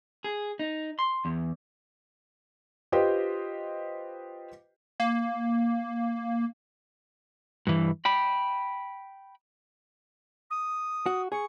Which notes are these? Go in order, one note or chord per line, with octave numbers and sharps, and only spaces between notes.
G#4
D#4
C6
E2
F4 G4 B4 C5 D#5 G5
A#3
G2 E3
G5 B5
D#6
F#4
G#4 C#6